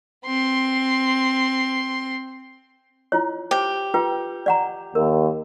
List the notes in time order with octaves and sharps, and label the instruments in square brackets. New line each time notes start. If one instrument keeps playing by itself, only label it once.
[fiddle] C4 C6
[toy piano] E4 F4 C#5
[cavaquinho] G4 [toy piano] C5
[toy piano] F4 B4 G5
D5 F#5 A#5
[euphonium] D#2 [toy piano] A#4